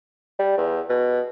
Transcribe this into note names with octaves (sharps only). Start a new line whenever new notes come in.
G3
E2
B2